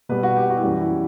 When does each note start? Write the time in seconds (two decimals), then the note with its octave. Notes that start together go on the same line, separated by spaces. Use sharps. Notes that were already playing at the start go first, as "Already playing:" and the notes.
0.09 B2 G3 B4
0.23 F#4
0.36 G4
0.50 F#4
0.57 E4
0.63 F#2 E3 G3 F#4
0.81 E4